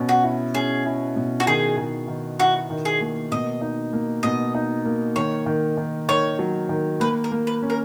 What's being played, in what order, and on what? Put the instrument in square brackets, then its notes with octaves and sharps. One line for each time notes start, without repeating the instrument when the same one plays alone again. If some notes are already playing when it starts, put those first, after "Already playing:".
Already playing: [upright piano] B2 C#4
[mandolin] F#4
[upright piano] E4
[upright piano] C#4 [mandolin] G#4
[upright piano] E4
B2
[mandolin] F#4
[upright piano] D#3 [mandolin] G#4
[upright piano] D#3
D#3
[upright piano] E4 [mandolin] F#4
[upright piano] D#3
[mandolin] G#4
[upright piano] A#3
[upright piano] B2 [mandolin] D#5
[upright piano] D#4
A#3
[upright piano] B2 [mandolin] D#5
[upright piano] D#4
A#3
[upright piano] D#3 [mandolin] C#5
[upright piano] D#3
D#3
[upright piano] D#3 [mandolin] C#5
[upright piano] F#3
D#3
[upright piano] A#3 [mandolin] B4
[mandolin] A#4
[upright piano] A#3
[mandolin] B4
[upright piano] C#4
[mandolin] A#4